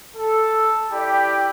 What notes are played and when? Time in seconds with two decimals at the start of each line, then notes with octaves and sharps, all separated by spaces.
0.16 A4
0.92 E4 G4 D5 G5 B5